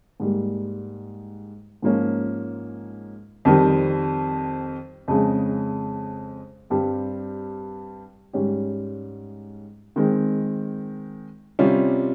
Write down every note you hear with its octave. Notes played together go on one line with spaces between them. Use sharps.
G#2 G3 A#3
G#2 F3 A#3 C#4
F2 D#3 G3 C4 G4
F2 C#3 G#3
G2 G3 C4 G4
G#2 G3 C#4 G4
D#3 G#3 C4
C3 G3 C#4 F4